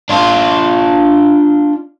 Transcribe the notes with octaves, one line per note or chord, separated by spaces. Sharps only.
D4 F4